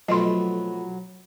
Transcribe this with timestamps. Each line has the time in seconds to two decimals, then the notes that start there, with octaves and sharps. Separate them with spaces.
0.09 B1 F2 F#3 A3 F4 D#5 B5 C6